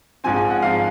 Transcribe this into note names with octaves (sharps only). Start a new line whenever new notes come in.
A#1 G#2 F3 C4 G#5
G#5
F#5
G#2 F3 C4 F5